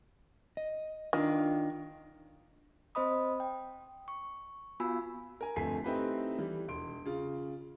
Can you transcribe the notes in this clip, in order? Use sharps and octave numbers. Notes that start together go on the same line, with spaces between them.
D#5
D#3 D4 F4
C4 C5 D#5 B5 D#6
G5
C#6
B3 F4 F#4 G#5 B5 E6
A#4 G#5
G1 F2 A3 G#5 B6 C7
A3 C4 D#4 E4 G4 B4
E3 G3
E1 C6 D7
C#3 F4